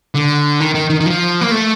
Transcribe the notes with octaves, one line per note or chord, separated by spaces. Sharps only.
D3
D#3
D#3
D#3
D#3
F3
A#3
A3